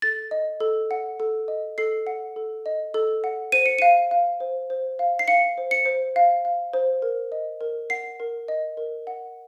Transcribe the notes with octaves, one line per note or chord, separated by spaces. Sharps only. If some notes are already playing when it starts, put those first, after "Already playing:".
A4 A6
D#5
A4
F#5
A4
D#5
A4 C7
F#5
A4
D#5
A4
F#5
C5 D#7
C#7
F5 D#7
F5
C5
C5
F5
C7
F5 C#7
C5
C#7
C5
F5
F5
C5
A#4
D#5
A#4
F#5 C7
A#4
D#5
A#4
F#5